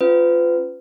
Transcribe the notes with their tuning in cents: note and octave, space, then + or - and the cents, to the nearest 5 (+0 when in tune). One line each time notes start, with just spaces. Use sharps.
C#4 +0 F4 +0 B4 +40